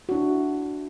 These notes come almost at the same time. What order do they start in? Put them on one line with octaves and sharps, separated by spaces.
F#4 D4 E4